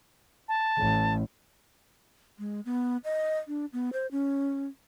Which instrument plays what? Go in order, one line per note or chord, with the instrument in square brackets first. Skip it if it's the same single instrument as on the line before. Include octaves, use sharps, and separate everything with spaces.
[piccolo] A5
[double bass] A1
[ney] G#3
B3
D#5
D4
B3
C5
C#4